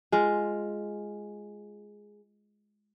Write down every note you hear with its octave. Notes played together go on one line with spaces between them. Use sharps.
G#3 F4